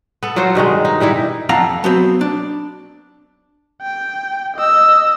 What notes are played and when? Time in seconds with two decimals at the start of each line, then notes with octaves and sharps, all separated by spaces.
0.23 B3 A4
0.36 F#3 F4 F#4 C5
0.55 G2 B2 D#3 G#3
0.85 D#4
1.00 E3 G3 D#4 E4
1.49 F2 F5 F#5 A#5
1.84 F#3 B3 C4
2.21 D4
3.82 G5
4.57 D#5 E6